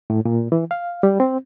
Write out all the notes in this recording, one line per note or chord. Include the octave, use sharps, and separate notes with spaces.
A2
A#2
E3
F5
G3
C4